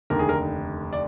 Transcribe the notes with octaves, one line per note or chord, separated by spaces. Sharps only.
F1 D#2 D3 A#4
G#4
A#4
D5